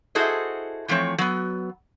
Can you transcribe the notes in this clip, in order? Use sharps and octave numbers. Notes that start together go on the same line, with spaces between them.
E4 F#4 G#4 A4 C5 D#5
E3 F3 A3 C4 C#5
F#3 B3